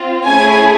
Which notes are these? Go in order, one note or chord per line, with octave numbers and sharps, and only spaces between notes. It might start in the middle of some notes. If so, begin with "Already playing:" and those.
Already playing: C4 F4
A3 C#4 E4 G#4 G#5